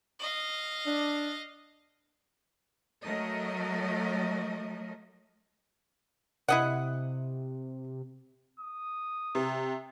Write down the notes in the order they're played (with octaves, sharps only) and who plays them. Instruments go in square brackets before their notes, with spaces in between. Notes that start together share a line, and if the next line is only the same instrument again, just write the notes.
[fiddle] D#5 F5
[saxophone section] D4
[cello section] F#3 A3 A#4 D#5
[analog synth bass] C3 [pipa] E4 D#5 F#5
[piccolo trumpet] D#6
[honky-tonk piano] C3